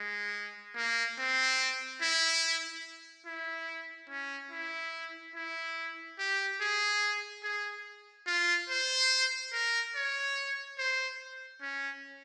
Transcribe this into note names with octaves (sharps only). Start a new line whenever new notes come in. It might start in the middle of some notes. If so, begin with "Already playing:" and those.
Already playing: G#3
A#3
C4
E4
E4
C#4
E4
E4
G4
G#4
G#4
F4
C5
A#4
C#5
C5
C#4